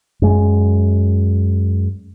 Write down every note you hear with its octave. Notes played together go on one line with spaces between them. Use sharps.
F#2 G#3